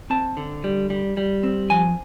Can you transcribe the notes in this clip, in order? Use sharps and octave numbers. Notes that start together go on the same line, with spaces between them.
C4 A5
D3
G3
G3
G3
C4
F3 G#5